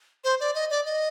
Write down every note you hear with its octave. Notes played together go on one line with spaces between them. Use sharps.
C5
D5
D#5
D5
D#5